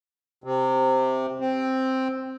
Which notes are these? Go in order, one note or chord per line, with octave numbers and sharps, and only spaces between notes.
C3
C4